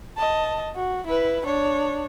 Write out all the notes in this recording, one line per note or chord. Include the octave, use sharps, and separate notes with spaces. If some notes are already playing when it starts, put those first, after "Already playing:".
D#5 A5
F#4
E4 B4
D4 C#5